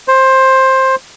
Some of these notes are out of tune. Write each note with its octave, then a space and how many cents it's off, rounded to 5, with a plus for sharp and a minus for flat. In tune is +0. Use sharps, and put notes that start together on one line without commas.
C5 +15